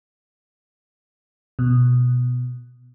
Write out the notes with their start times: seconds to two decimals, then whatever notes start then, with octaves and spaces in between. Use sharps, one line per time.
1.59 B2